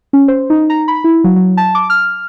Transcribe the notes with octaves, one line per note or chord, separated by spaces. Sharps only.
C#4
C5
D#4
A#5
B5
E4
F#3
F#3
A5
D6
F6